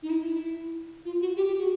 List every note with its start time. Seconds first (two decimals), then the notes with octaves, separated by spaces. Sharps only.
0.03 D#4
0.10 E4
0.25 E4
1.05 F4
1.21 F#4
1.37 G4
1.47 G4
1.58 F#4